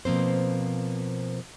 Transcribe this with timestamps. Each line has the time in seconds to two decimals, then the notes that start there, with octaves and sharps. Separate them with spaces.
0.05 B2 F3 A#3 C4 C5